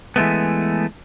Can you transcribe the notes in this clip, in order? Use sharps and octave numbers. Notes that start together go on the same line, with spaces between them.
E3 G#3 A3 B3